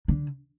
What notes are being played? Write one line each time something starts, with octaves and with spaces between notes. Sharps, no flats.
D3